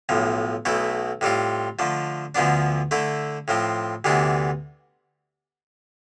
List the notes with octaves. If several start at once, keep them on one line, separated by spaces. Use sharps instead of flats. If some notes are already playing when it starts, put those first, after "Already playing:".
B1 A2 F3
B1 B2 A3 E4
A2 G3 C4 F4
D3 F3 A3
D2 D3 F3 B3 D4
D3 A3 E4
A2 F3 C4
D2 C3 E3 B3 D4